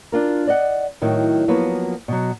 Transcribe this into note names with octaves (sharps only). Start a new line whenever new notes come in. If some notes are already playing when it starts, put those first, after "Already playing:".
D4 F4 A#4
D5 D#5 F#5
A2 D#3 F#3
F3 F#3 A#3 B3
B2 F#3